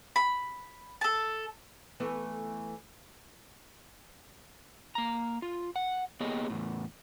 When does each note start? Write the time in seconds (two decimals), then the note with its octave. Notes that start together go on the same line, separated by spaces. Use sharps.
0.16 B5
1.01 A4 A5
2.00 E3 A3 B3
4.95 A#3 A#5
5.42 F4
5.76 F#5
6.20 A#3 B3 G4 G#4 C#5 D#5
6.50 E2 A2